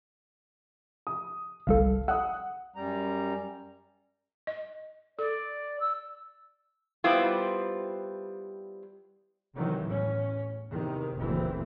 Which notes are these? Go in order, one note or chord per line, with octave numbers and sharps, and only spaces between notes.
D#6
G1 C2 A4 F5
F#5 D#6 E6 F#6
F#2 G3 A#5
D#5
A4 D5
E6
G3 B3 C4 E4 F4
C3 D#3 E3 F#3
E2 A2 C#4
E2 C3 D#3
F#1 D2 A#2 E3 C4